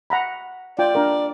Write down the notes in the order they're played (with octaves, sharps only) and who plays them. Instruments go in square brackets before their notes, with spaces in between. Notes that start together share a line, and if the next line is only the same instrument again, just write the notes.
[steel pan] F#5 A#5 B5
[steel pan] F4 G5 [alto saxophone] D5
[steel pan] D4 A#4